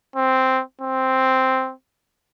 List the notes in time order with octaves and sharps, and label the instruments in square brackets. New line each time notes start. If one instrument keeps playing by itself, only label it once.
[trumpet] C4
C4